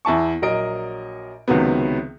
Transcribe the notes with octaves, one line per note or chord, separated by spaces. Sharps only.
E2 E4 A5 C#6
A#1 F#3 A#4 D#5 D7
C#2 C3 D#3 F#3 B3